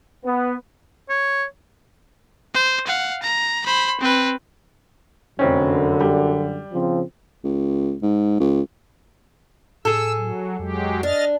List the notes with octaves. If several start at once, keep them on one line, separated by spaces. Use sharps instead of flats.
B3
C#5
C5
F5 F#5
A#5
C5 B5
C4 B4
F1 F#2 D3 C4 C#4
G3
C#3 F3 C4
C#2
G#2
C#2
A2 G#4 A4 E6
F#3
F2 F#3 G#3 G4
D4 D#5 F6 A6